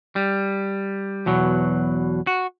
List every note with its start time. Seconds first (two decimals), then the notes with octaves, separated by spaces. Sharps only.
0.16 G3
1.26 E2 B2 F#3
2.27 F#4